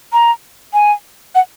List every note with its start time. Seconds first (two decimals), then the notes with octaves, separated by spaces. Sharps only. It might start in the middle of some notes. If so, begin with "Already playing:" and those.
0.13 A#5
0.73 G#5
1.35 F#5